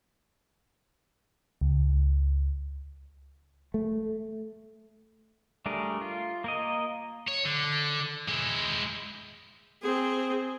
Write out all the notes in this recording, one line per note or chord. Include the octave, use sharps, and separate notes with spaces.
C#2
A3
G3 A3 D4 G#4 A#4
F4
A#3 A#4 D#5
C#5
D3
G#3 E4
C4 G#4